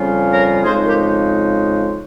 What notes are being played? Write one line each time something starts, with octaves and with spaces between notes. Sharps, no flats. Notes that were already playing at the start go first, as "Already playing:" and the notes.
Already playing: F2 C#3 G3 C#4 F4
A#4 C#5
F2 C#3 G#3 D#4 G#4 C5
G4 A#4